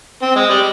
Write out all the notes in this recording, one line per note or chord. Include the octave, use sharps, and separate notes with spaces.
C4
G#3
G3